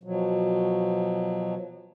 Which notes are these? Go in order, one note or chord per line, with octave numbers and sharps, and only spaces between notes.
B2 F3 F#3